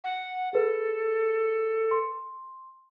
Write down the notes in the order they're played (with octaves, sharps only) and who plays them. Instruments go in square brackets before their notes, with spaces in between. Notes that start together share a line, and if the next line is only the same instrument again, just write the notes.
[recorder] F#5
[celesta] G#4 B4 [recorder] A4
[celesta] C6